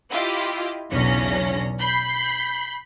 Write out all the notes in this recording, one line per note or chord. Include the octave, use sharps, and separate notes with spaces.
E4 F4 G4 D#5
B1 E2 C#3 C#4 D4 A#6
B5 G6 C7